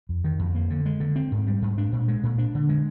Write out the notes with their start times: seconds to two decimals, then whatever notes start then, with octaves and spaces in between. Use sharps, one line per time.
0.09 F2
0.24 D#3
0.39 F2
0.55 A#3
0.70 D3
0.85 G#3
1.00 D3
1.16 C4
1.32 G#2
1.47 G3
1.62 G#2
1.78 D4
1.92 A#2
2.08 G#3
2.23 A#2
2.38 D4
2.55 D3
2.69 G#3